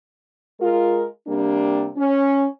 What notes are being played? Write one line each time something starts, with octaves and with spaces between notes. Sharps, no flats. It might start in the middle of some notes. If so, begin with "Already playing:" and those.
G#3 F4 A#4
C3 G3 A#3 D4
C#4